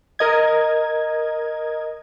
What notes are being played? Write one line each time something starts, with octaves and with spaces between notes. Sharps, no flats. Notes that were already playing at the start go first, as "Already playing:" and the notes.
A#4 D#5 G#6